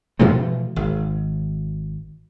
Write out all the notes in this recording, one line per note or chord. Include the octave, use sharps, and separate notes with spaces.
B2 E3 F3 A3
G#1